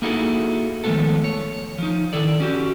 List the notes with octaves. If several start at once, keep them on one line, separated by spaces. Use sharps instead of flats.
A#3 D#4 E4 F#4 G#4 A4
D#3 F3 G#3 A3 B3 A4
C#5
F3 D#4
D#3 E4 A4 D5
C#4 F#4 G4